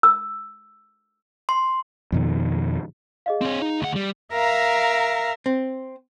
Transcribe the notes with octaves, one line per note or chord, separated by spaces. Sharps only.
E6
C6
F2 B2 D#3
G#4 D#5 F5
C4 C#5
D#4
D2 F#5
G3
A#4 E5 F5 A#5
C4